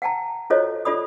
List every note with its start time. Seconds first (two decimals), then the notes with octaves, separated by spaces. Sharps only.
0.02 F#5 G5 A5 A#5
0.50 F4 F#4 A4 C5 C#5 D#5
0.85 F4 A4 D5 B5 D#6